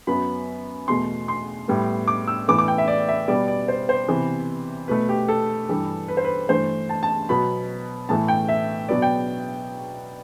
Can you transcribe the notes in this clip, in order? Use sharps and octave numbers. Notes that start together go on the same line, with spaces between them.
F#2 F#3 B3 B5
E2 B2 A3 C6
C6
A2 G3 B3
D6
E6
A2 E3 B3 D6
D6
G5
E5
D5
E5
B2 G3 B3 D5
D5
C5
C5
C3 E3 B3
B2 A3 B4
G4
A4
G2 E3 G3
B4
C5
B4
G2 E3 A3 C5
A5
A5
B2 F#3 B3 B5
A2 E3 A3 A5
G5
E5
B2 F#3 B3 D5
G5